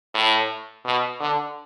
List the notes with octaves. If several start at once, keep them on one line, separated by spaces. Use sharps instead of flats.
A2
B2
D3